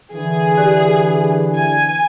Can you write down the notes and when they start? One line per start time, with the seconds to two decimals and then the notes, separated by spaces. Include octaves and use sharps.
0.13 D3 E3 G#4
0.57 G4 D5 F#6
1.57 G#5